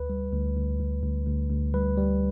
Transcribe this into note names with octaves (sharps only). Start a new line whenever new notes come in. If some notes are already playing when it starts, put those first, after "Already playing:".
Already playing: D2 B4
G3
D2
D2
D2
D2
D2
D2
G3 B4
G3